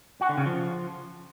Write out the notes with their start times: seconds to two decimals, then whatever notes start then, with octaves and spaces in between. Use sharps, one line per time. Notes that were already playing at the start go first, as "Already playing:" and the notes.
0.21 F#4
0.29 D3
0.38 C#3
0.46 F3